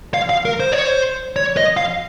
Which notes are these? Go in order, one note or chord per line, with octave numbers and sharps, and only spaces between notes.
F5
F5
A#4
C5
C#5
C5
C#5
D#5
F5